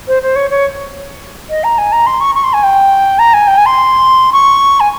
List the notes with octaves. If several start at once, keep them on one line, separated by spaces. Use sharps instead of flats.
C5
C5
C#5
C#5
D#5
A#5
G#5
A#5
C6
C#6
C#6
C6
G#5
G5
A#5
G#5
G5
G#5
C6
C#6
G#5